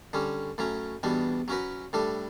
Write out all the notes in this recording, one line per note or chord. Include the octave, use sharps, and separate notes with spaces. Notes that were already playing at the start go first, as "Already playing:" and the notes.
D3 G3 C#4
A2 F#3 C#4
E2 B2 G3 D4
F#3 C#4 F#4 B4
A2 G3 D4 A4